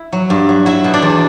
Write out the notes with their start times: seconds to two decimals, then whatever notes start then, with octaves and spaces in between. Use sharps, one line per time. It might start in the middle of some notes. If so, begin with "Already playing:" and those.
Already playing: E4
0.13 F#3
0.30 G2
0.49 F#3
0.66 F#3 E4 E5
0.84 B2
0.94 D4 D5
1.02 E2